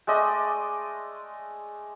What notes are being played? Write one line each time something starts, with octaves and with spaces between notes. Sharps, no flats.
G#3 A3 D5 D#5